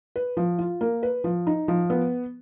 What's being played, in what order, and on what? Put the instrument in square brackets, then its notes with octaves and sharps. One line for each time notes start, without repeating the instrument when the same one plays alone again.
[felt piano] B4
F3
F4
A#3
B4
F3
D#4
F3
B3